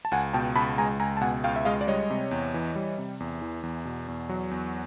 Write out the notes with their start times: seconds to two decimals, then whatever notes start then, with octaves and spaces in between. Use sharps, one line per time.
0.05 A5
0.12 C#2 F#5 G#5
0.33 B2 G5 A5
0.56 C#2 A5 B5
0.78 G#3 G#5 A#5
0.99 C#2 G#5 A#5
1.17 A5
1.21 B2 F#5 G#5
1.44 C#2 F5 G5
1.56 E5
1.65 G#3 D#5 F5
1.81 D5
1.87 G3 C#5 D#5
2.10 C3
2.31 E2
2.54 E3
2.76 G3
2.98 C3
3.20 E2
3.42 E3
3.63 E2
3.85 B2
4.08 E2
4.29 F#3
4.51 E2